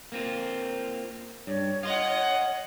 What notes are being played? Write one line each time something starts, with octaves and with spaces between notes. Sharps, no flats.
A#3 C4 F4
G2 C#5
D#5 F5 F#5 C6